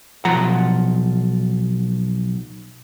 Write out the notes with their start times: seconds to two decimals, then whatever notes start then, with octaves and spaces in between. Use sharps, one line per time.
0.25 B1 F3 F#5 A#5